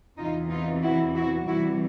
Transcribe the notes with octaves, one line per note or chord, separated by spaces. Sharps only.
E2 C3 E3 D#4 F4
D#4 F4
E4 F#4
E4 F#4
C3 E3 G3 E4 F#4